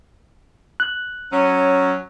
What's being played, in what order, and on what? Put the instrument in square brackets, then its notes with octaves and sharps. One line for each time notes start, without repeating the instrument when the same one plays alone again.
[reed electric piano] F#6
[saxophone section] F#3 C#4